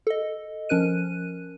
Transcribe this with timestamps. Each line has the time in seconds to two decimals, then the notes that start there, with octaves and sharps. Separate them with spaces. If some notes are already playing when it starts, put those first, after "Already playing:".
0.07 A4 D#5
0.69 F3 C#4 A#4 F#6 D#7